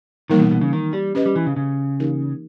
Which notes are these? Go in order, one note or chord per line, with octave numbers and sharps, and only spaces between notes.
D#3 E3 G3 A#3 D#4 A#4
B2
B2
C#3
D#3
G3
C#4 G4 B4 D#5
G3
E3
C#3
C#3
E3 A#3 D#4 G4 A#4